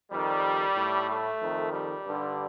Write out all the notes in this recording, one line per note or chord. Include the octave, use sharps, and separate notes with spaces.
F2 D#3 G3
A2
A3
F2 D#3
G3
G2 D3